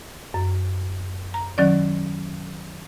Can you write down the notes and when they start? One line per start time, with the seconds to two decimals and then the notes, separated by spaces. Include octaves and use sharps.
0.34 F#2
1.34 A#5
1.58 D#3 F#3 C#4 D5